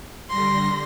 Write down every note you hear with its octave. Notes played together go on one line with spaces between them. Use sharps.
D3 G3 C6 A#6